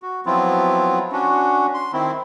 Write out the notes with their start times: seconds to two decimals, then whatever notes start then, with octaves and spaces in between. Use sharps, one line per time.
0.02 F#4
0.26 F3 F#3 B3 C4 E4 F4
1.12 C#4 D4 F#4
1.74 C6
1.93 D#3 C4 E4